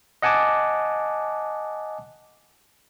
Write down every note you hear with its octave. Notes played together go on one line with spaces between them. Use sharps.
D#5 F#5 G#5 A5 D6